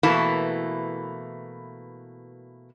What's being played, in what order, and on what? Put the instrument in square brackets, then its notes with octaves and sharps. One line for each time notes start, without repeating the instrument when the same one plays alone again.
[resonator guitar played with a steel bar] B2 E3 A3 A#3 E4